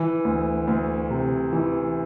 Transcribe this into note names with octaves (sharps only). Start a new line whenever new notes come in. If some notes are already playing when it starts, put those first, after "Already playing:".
Already playing: E3
D2
D2
C3
E3